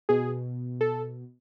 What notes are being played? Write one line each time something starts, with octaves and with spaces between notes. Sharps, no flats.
B2 G#4
A4